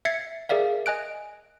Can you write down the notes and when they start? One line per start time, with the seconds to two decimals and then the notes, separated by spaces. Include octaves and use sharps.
0.05 E5 G#6 A6 C7 C#7
0.49 G#4 A#4 D5 E5 F5
0.86 D#5 G#5 F#6 D7